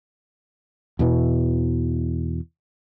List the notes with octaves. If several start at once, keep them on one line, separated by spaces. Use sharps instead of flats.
E2 B2 E3